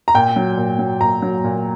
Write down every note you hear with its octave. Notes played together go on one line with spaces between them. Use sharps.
A#5
A#2 G5
F#3
A#2
F#3
A#2 A#5
F#3
A#2